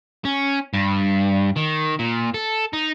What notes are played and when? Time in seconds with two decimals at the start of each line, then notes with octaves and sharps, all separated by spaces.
0.25 C#4
0.73 G2
1.57 D#3
1.99 A#2
2.34 A4
2.73 D#4